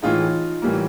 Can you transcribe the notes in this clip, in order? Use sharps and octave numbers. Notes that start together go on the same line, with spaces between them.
A2 E3 G#3 D#4 F4
A2 E3 G3 A#3